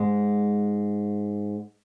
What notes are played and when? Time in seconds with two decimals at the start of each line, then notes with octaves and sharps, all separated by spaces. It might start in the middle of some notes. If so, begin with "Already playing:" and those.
Already playing: G#2 G#3